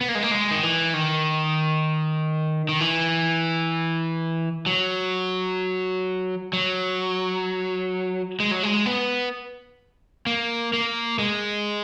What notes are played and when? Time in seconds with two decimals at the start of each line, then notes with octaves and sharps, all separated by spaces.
0.01 B3
0.09 A#3
0.15 G#3
0.23 A#3
0.31 G#3
0.51 D#3
0.63 E3
0.94 D#3
2.69 D#3
2.80 E3
4.66 F#3
6.53 F#3
8.40 G#3
8.51 F#3
8.63 G#3
8.86 B3
10.26 A#3
10.73 A#3
11.19 G#3